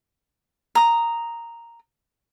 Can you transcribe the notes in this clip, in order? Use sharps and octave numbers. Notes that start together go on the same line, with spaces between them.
A#5 D#6